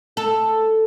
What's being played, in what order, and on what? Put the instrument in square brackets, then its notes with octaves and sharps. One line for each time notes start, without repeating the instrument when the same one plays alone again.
[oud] A4